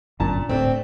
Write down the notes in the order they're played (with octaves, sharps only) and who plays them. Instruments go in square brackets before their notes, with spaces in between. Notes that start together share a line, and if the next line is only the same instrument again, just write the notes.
[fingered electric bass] G1 F#2 D4 [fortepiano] A#2 A5 A#5
[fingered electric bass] D1 A2 [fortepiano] A3 D4 [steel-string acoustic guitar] C4